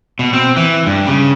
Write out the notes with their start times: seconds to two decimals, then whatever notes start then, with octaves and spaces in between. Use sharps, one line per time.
0.19 B2
0.33 C4
0.57 E3
0.86 G2
1.07 C#3